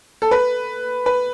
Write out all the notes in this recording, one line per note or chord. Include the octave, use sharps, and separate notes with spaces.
A4
B4
B4